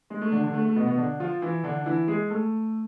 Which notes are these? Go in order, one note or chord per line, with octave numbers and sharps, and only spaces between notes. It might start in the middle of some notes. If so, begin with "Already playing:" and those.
G#3
A3
D3 D4
D3 D4
A3
A3
B2 B3
B2 B3
D3 D4
F3 F4
E3 E4
D3 D4
D4
E3 E4
G#3 G#4
A3 A4